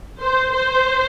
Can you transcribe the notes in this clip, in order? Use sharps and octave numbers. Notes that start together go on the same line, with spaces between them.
C5
C5